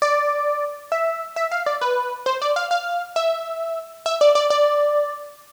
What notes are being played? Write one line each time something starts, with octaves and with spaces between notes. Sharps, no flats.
D5
E5
E5
F5
D5
B4
C5
D5
F5
F5
E5
E5
D5
D5
D5